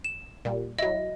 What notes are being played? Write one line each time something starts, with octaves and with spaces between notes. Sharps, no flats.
E7
A#2 G3
F#3 E4 D#5